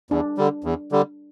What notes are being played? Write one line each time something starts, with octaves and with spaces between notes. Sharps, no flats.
E2 D4
D3 G3
E2
D3 G3